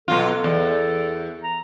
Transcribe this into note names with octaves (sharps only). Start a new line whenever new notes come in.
B2 F#3 F4 A4
E2
A#5